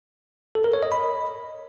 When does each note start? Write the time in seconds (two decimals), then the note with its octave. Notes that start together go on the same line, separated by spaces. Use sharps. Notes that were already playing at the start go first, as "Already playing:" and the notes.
0.55 A4
0.64 A#4
0.73 C#5
0.83 D#5
0.92 B5